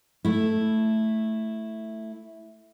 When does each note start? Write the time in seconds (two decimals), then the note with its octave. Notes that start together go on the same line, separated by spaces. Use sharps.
0.25 A3 E4